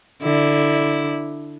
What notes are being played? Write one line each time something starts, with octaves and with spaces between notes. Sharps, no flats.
D3 E4